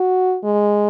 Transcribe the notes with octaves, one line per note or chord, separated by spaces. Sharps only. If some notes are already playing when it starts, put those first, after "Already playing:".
Already playing: F#4
G#3